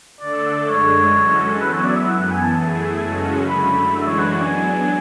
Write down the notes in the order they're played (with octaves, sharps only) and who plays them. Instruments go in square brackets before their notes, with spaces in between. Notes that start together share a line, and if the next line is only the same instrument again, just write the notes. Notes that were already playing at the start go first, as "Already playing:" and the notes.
[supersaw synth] D3 A3 D4 A4 [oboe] D5
[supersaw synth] F#2 D3 G#3 D4 [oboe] C#5
[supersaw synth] E3 G#3 C#4 F#4 A4
[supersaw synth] F#3 B3 E4 [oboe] B4
[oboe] C#5
D5
E5
[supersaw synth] F#2 E3 B3 [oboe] F#5
[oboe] F#5
G#5
A5
[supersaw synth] E3 A3 E4 G#4 [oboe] A5
[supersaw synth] F#2 C#3 G#3 C#4 F#4
[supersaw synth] F#2 D3 A3 [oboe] B5
[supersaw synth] F#2 E3 G#3 D4 F#4 [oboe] E5
[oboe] C#5
B4
C#5
[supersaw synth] F#3 B3 D4 [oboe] G#5